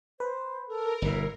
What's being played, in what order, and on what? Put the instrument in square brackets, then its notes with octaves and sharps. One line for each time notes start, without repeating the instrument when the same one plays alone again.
[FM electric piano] B4 [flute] C5
[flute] A4 [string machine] A#4
[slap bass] G1 B2 [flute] E4